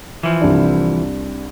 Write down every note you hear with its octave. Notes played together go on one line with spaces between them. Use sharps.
E3 F3
C2 D4